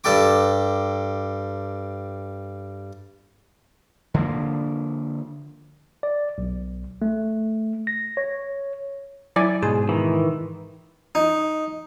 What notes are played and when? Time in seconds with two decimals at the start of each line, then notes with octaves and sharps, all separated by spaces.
0.04 G2 A4 G5 D6
4.14 D3 F3 A#3
6.03 D5
6.38 B1
7.02 A3
7.87 A#6
8.17 C#5
9.36 F#3 E4 D5 G#5
9.62 G#2 B2 G#3 G#4 C6
9.89 D#3 E3
11.15 D#4